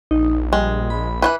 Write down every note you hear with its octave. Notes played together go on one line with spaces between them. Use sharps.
A#1 D#4
G3 G#3
B5
E3 F#3 B4